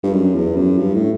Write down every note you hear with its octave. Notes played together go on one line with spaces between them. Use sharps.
G2
F#2
E2
F#2
G2
A2